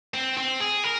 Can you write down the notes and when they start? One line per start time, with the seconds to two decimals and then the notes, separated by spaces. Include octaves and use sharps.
0.14 C4
0.37 C4
0.61 G#4
0.84 A#4